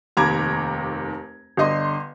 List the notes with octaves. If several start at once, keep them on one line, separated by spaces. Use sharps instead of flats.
F1 D#2 A#5 B5 D6 G#6
G1 D3 D#5 C6